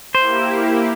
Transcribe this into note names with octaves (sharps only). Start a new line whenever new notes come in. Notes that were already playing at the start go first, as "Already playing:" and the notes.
A#3 E4 G4 C5